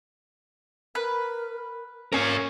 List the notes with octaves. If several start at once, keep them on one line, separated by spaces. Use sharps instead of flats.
A#4 B4
A#3 C#4 A#4 G#5